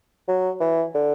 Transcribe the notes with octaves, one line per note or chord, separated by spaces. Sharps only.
F#3
E3
D3